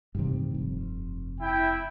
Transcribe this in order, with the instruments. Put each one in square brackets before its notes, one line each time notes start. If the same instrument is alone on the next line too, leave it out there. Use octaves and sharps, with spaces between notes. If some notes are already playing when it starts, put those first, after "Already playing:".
[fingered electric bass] A1 D#3 G3 [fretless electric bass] G2 C3
[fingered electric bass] F1 F2
[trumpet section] E4 G5